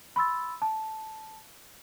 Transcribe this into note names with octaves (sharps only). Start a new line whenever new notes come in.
B5 C6 E6 A6
A5